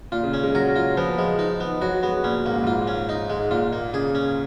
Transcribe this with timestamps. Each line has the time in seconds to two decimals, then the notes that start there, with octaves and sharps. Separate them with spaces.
0.12 A#2 F4
0.23 C#3
0.34 C#4
0.43 G#3
0.55 F#3 A#4
0.76 F4
0.97 F3 B3
1.18 G#3
1.39 D#4
1.60 B3
1.82 F#3 F#4
2.03 G#3 B3
2.24 A#2 C#4
2.45 G#2 A#3
2.54 A#2
2.64 G#2 F4
2.87 C#4
3.09 D#4
3.30 G#3
3.51 A#2 F4
3.73 A#3
3.93 C#3 G#4
4.15 C#4